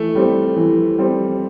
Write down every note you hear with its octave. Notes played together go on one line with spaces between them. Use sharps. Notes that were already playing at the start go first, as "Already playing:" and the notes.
Already playing: E3 A3
G3 C4
E3
G3 C4